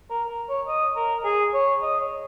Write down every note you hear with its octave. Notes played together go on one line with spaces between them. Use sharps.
A#4
A#4
C#5
D#5
A#4
G#4
C#5
D#5
C#5